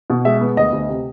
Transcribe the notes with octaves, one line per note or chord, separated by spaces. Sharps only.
B2
G#3 E5
B3
D2 D#5
D2
C3